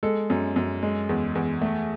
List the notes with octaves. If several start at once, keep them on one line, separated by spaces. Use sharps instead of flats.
G#3 A4
F#2
F#2
G#3
E2
E2
A3